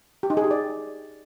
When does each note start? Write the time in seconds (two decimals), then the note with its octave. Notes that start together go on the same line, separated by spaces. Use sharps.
0.23 G4
0.30 D#4
0.37 G#4
0.44 G4
0.51 D5